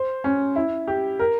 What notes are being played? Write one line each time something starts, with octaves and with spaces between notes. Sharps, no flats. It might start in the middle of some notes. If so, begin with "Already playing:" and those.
Already playing: C5
C#4
E4
G4
A#4